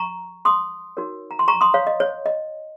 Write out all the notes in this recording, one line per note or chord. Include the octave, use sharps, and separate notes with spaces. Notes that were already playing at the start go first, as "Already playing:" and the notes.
Already playing: A#5 C#6
C6 D#6
D#4 F#4 A#4 C#5
A#5
C6
A#5 C#6
C6 D#6
C#5 F5
D#5
C#5
D#5